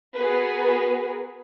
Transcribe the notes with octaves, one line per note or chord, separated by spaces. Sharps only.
B3 F#4 G#4 A#4 B4